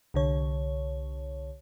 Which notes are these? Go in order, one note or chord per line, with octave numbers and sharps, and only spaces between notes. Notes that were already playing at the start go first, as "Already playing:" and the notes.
C2 D3 C#5